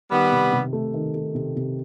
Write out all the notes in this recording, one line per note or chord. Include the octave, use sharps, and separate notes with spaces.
D#3 G3 B3
C3
C3
A3
D#3
A3
C3
C3